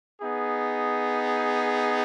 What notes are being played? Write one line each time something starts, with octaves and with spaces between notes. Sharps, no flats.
B3 D#4 G#4